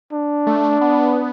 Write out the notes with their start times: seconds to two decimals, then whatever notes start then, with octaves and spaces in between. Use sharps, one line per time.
0.13 D4
0.47 A3
0.81 B3